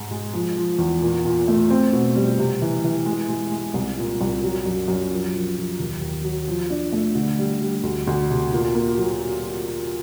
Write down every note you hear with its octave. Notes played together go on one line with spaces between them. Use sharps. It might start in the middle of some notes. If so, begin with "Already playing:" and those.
Already playing: G#2 G#3
G#3
F3
F3
E2
A#2
A#2
A3
C4
B2
G3
C3
E3
E3
G#3
G#3
G#3
C2
A#2
C2
F#3
F#2
F#2
F3
F3
F3
D#2
D#2
F#3
F3
D4
A3
D3
G3
G3
D2
D2
C3
A#2
A#3
F#3